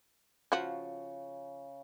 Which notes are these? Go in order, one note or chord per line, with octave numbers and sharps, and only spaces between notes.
C#3 F3 F4 F#4